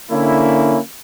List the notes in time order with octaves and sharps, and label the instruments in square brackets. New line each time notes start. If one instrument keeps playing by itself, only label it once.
[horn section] D3 A#3 C#4 E4